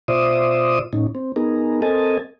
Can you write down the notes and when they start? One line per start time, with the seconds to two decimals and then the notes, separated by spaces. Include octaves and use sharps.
0.08 B2 F4 C5 D5 E5 D#6
0.93 A2 C#4 D#4
1.15 C4
1.36 B3 D#4 G#4 A#4
1.82 C4 A4 A#4 D#5 G#5 A5